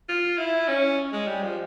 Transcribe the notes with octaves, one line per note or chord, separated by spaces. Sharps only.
F4
E4
C#4
G#3
G3
F3